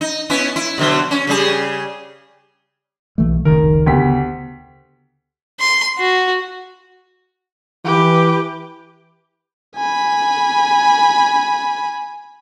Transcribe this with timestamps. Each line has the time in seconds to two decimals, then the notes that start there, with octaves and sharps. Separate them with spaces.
0.01 D#4
0.30 B3 C#4 E4
0.56 E4
0.78 B2 D3 F#3
1.11 C#4
1.27 C#3 G3 G#4
3.18 B1 E3 A3
3.45 F1 C#2 D#3 A#4
3.86 D2 C#3 B3 G4 B6
5.60 C6
5.98 F#4
7.85 E3 G4 B4
9.76 G#5 B5